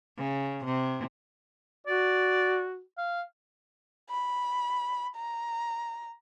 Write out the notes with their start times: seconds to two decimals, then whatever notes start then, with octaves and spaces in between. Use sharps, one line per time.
0.18 C#3
0.65 C3
1.87 F#4 D5
2.98 F5
4.10 B5
5.16 A#5